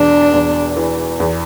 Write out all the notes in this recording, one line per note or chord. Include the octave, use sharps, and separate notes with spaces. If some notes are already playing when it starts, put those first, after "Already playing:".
Already playing: E1 E2 D4
E2
E3
E2